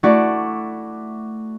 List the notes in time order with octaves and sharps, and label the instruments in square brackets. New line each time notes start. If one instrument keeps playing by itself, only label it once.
[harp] A3 E4 F#4 D5